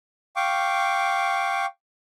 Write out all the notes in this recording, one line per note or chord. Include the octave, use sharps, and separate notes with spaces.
F5 G5 C#6 D6